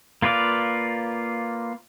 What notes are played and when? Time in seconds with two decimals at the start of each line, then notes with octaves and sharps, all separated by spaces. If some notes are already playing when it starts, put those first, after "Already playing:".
0.22 A#3 F4 B4 D5 F5